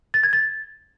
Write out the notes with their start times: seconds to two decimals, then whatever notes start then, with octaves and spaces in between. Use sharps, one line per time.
0.14 A6
0.23 G#6
0.33 A6